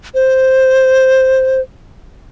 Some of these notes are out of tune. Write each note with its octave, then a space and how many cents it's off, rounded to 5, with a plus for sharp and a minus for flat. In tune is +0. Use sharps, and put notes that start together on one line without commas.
C5 +0